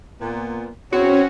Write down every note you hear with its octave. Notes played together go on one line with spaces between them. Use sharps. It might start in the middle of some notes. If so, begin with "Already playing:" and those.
A#2 B3
E2 C#3 C4 C#4 F#4 C#5